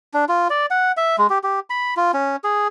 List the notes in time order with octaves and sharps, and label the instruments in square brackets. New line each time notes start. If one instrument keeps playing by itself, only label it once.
[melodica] D4
F4
D5
F#5
E5
G#3
G4
G4
B5
F4
C#4
G#4